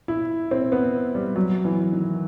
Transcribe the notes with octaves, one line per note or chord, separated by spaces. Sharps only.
E4
C4
B3
G3
F#3
E3
D#3